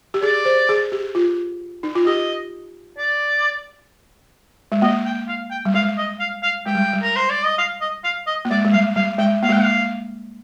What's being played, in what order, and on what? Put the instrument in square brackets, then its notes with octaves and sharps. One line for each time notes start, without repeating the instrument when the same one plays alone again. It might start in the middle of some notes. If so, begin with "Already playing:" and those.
[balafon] G4
[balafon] G#4 [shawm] D5
[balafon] C5
G#4
G4
F4
D#4
F4
[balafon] G4 [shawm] D#5
[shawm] D5
[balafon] G#3
[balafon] A#3 [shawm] D#5
[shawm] G5
F5
G5
[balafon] G3
[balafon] G#3 [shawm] F5
[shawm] D#5
F5
F5
[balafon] G#3 [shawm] G5
[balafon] G3
G3
[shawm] A#4
C5
D5
D#5
F5
D#5
F5
D#5
[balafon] A#3
[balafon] G#3 [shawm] D5
[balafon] G#3
[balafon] G3 [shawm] F5
[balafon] G3 [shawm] F5
[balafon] G#3 [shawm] G5
[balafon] A#3 [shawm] F5
[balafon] G#3
[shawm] G5
[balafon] A#3
[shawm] F5